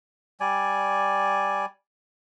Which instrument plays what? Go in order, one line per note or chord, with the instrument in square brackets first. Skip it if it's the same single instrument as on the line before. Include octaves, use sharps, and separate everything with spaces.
[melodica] G3 D5 G#5